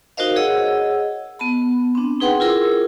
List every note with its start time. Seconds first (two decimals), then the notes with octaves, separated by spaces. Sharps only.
0.17 D#4 F#4 A#4 C5 D#5 F5
0.36 G#4 C#5 D#5 F#5 E6
1.39 B3 A5 B5
1.95 C4 D4
2.20 D#4 G#4 B4 F#5 G5 C6
2.40 E4 F4 G#4 A#4 E6